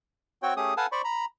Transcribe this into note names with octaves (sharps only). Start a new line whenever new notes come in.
C4 F#4 C#5 G5
A3 C#4 G4 G#4 D#6
A4 B4 F5 F#5 G#5 A5
C5 D5 B5 C#6
A#5 B5